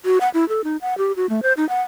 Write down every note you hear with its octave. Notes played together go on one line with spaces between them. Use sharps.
F#4
F#5
E4
A4
D#4
F#5
G4
F#4
A3
C5
D#4
F#5